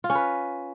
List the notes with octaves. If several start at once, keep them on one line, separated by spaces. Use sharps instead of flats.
F4
C#4
B4